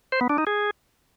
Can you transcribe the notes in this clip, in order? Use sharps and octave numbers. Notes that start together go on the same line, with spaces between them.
C5
B3
D4
D#4
G#4